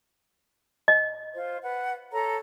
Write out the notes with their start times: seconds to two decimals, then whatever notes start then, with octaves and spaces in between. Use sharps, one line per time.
0.88 D#5
1.34 F4 C5
1.62 B4 F#5
2.12 A4 C#5 A#5